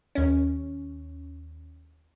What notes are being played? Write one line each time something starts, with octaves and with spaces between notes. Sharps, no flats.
D#2 C#4